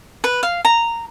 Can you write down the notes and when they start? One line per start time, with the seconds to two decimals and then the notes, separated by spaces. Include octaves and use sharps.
0.24 B4
0.43 F5
0.65 A#5